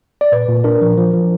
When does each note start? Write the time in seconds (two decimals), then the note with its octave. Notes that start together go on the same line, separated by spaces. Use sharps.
0.21 D5
0.32 A#2 B4
0.49 A#2
0.64 D4 A#4
0.82 F3
0.98 F3
1.14 F3